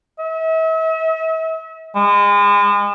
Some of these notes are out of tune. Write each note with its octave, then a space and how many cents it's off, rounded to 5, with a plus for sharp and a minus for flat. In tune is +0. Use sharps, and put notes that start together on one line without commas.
E5 -40
G#3 -35